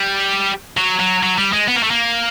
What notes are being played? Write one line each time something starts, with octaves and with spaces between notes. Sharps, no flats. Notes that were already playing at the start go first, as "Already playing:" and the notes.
Already playing: G3
F#3
F#3
F#3
G3
G#3
B3
A#3
A3
A#3